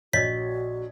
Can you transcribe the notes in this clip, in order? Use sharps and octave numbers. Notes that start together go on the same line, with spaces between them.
A#1 F#4 C#5 D#5 G#6 B6